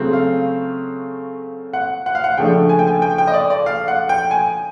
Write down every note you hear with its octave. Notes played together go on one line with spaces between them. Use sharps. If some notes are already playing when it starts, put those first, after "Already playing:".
Already playing: C#3 F#3 A3 C4
F5
F#5
F#5
F5
F#5
C#3 F3 A3 D4 G5
G#5
G5
G#5
G5
G5
D#5
D5
D5
F5
F#5
G5
G#5